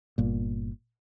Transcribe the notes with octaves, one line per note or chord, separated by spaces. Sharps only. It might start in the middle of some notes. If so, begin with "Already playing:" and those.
G1 A#2